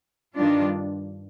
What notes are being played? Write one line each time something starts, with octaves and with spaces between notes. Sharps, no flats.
G2 D#3 G3 D4 F4